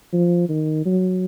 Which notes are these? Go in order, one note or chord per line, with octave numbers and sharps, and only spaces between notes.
F3
D#3
F#3